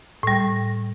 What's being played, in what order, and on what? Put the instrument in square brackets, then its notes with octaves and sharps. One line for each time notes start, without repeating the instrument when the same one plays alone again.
[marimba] A2 G3